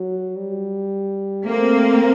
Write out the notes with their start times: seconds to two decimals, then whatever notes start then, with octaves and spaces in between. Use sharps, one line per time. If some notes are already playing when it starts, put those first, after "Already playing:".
Already playing: F#3
0.38 G3
1.46 A3 A#3 C4